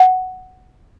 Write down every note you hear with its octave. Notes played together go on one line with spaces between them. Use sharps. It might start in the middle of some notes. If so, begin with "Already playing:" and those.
Already playing: F#5